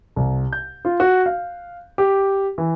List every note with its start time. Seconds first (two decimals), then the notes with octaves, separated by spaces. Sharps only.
0.16 C2
0.53 G6
0.85 F4
1.00 F#4
1.26 F5
1.98 G4
2.58 E3